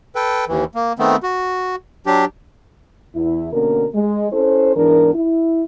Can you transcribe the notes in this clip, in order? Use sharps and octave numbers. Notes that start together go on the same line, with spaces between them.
A4 B4 G5
D#2 E3
A#3
D#3 A3 B3 C4
F#4
F#3 D4 G4
E2 E4
B2 D3 A#3 C#4 A#4
G#3
C#4 E4 A4 C5
E2 G#2 E3 D4 A#4
E4